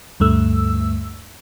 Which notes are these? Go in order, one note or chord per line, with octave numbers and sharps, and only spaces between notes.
D2 G2 A3 E6